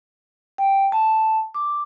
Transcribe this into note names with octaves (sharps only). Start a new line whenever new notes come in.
G5
A5
D6